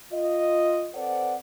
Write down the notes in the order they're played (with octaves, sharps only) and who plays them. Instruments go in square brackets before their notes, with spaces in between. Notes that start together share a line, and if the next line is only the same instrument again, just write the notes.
[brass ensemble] F4 D#5
C4 A4 B4 C5 D5 F#5